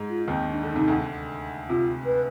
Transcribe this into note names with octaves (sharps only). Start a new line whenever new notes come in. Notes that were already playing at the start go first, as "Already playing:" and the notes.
Already playing: G#2 G#3
F4
D#2 D#3 C4
D4
D3
C3 D#4
D2 D3
C3 F4
B4